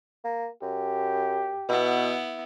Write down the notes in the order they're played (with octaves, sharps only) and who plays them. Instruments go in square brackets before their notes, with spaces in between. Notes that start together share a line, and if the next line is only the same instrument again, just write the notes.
[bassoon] A#3
[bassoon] F#2 [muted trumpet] G4
[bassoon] B2 [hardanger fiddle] B3 E4